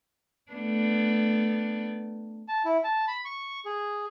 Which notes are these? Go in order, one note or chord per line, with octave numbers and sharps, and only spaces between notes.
A3 B3 D4
A5
E4
A5
B5
C#6
G#4